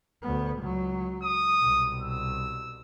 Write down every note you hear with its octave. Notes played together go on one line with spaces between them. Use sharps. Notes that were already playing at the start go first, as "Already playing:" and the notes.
D2 B3
C#2 F#3
D#6
C2 B2
E6